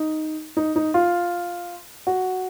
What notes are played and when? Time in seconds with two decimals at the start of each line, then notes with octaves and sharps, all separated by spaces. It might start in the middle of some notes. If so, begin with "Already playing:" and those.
Already playing: D#4
0.57 D#4
0.76 D#4
0.94 F4
2.07 F#4